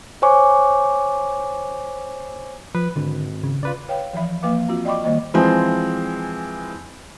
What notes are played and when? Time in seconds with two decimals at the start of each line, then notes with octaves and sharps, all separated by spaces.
0.22 C5 C#5 G#5 C#6 D6
2.75 F3 B4
2.96 G#1 D3
3.44 C#3
3.63 C#3 F4 B4 D5
3.89 B4 C#5 F5 G5
4.13 E3 F3 E5 B5
4.43 F3 A#3 B4 F5 D6
4.68 C4 F4 F#4
4.85 D5 D#5 G5 B5 C#6 D6
5.04 D#3 G3 A#3 D#5
5.34 E3 F3 G#3 C4